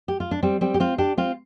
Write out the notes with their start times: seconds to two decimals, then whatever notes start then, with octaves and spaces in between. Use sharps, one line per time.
0.08 G4
0.20 F4
0.31 D4
0.43 G3 C4
0.61 G3 C4
0.74 G4
0.80 C4 F4
0.98 D4 G4
1.18 C4 F4